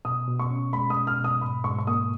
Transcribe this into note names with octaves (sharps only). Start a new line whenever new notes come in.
B2 D#6
B2
C#6
C#4
G#3 B5
D#6
B2
F6
B2
D#6
G#2 B5
G#2 C#6
C#6
A#3 D#6